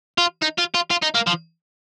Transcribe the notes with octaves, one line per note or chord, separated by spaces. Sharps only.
F4
D#4
F4
F4
F4
D#4
A#3
F3